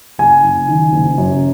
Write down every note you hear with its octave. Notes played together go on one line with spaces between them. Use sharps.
F#1 G#5
F#1
D#3
F#1
F#2